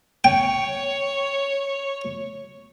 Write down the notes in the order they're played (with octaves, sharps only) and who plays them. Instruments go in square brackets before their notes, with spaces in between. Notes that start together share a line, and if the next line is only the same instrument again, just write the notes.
[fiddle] C#5 [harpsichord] G5